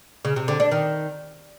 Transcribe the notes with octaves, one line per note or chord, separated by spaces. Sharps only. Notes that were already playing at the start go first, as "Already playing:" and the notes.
C#3
C3
D3
D4
D#3